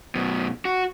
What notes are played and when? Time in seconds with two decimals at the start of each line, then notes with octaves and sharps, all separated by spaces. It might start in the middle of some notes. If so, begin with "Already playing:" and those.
0.15 F#2 B2
0.65 F#4